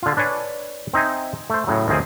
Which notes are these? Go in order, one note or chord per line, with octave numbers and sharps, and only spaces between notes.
D3 F4
D4 B4 C#5 G#5
C4 D#4 E5 G#5
A3 C5
A2 C#3 F#3
D2 D#3 F3 C4 G#4